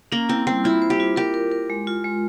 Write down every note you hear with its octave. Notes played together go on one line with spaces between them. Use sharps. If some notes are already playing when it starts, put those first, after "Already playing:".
A#3 C#4
C4 E4
G3 C4
E4 F4
C5
G4
F4
G4 A#4
A#4
A#4
G#3
F4
G#3